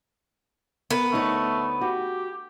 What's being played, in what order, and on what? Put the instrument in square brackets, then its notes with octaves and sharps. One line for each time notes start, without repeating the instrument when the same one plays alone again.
[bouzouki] B3 [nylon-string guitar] A#4
[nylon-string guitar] D2 D#4 C#5 [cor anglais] A3
[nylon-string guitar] F#4 [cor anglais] G4